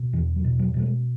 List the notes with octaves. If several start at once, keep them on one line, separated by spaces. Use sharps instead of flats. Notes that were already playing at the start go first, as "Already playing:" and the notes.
Already playing: B2
E2 E3
F#3
B2
F#3
B2 F#3
G#3